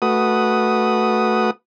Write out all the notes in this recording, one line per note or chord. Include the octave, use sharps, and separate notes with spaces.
A3 F#4 B4 D#6